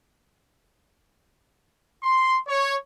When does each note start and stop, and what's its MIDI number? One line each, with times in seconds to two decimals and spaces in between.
2.03 2.38 84
2.48 2.75 73